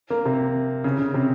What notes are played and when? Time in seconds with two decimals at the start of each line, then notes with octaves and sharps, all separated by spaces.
0.10 A#3
0.25 C3
0.84 C#3
0.98 C#3
1.14 C3